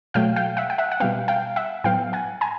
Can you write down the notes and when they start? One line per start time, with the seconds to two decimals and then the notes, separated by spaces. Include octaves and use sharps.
0.14 B2 F#3 A3 F5 G5
0.36 F5 G5
0.57 E5 F#5
0.70 G5
0.78 E5 F#5
0.91 F#5
1.00 B2 G3 B3 F5 G5
1.28 F5 G5
1.56 E5 F#5
1.84 A2 F#3 B3 F5 G5
2.13 F#5 G#5
2.41 G#5 A#5